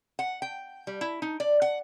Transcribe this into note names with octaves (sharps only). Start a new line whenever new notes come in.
F#5
G5
G3
E4
D#4
D5
F#5